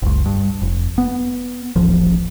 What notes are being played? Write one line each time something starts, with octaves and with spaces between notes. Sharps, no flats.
F#1 C#2
G2
F1
B3
D#1 A1 F3